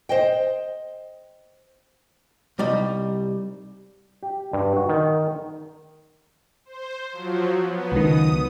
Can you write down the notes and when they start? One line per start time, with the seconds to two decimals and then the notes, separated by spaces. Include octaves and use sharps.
0.09 C5 D#5 G5
2.59 C2 G3 D#4 D#5
4.23 G4
4.53 G2
4.76 F#4
4.89 D#3
6.65 C5
7.13 F3 F#3
7.62 B3
7.92 C#2 D#3 D#6